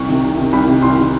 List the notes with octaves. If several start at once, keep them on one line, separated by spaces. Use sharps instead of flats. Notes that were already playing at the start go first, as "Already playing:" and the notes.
Already playing: C2 C#6
C3 D#3
C2
C3 D#3
C2 B5
C3 D#3
C2 C6
C3 D#3